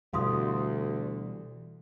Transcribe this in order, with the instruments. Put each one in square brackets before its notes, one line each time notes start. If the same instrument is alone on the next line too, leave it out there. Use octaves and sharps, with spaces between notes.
[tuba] D2 [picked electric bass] B2 E3 G3 [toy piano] F5 C6 D#6